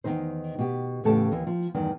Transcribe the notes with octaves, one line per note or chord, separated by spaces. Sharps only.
E2 B2 D#3 D#4 C5
B2 G4
E2 A2 C#3 G4 A4 A5
D#2 E3
F3
E2 G2 D#3